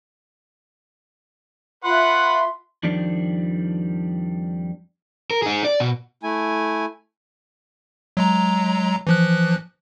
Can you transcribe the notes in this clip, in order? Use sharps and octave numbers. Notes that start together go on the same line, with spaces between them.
F4 B4 E5 F#5 C6
F2 D#3 F3 G3 D4
A#4
D#4 G#4
D5
B2
A3 E4 G#5
F#3 G#3 A#5
E3 F3 F#6